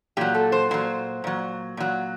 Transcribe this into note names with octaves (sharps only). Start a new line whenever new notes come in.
A#2 F#3 G4
A4
C5
A#2 F#3 C5
A#2 F#3
A#2 F#3